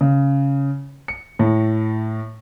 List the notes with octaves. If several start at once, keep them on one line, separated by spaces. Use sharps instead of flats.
C#3
C#7
A2